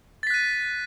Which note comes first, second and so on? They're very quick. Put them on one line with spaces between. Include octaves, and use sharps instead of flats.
A6 B6 F#6 D#7